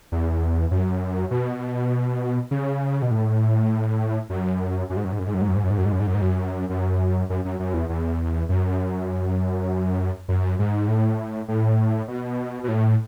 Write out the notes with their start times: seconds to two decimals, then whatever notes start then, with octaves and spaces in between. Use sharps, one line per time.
0.12 E2
0.71 F#2
1.31 B2
2.51 C#3
3.02 B2
3.11 A2
4.30 F#2
4.90 F#2
4.97 G#2
5.04 F#2
5.12 G#2
5.19 F#2
5.27 G#2
5.34 F#2
5.41 G#2
5.48 F#2
5.56 G#2
5.63 F#2
5.70 G#2
5.78 F#2
5.85 G#2
5.92 F#2
6.00 G#2
6.07 F#2
6.15 G#2
6.22 F#2
6.69 F#2
7.30 F#2
7.45 F#2
7.60 F#2
7.74 E2
7.89 E2
8.49 F#2
10.28 F#2
10.59 G#2
10.88 A2
11.48 A2
12.08 B2
12.64 B2
12.68 A2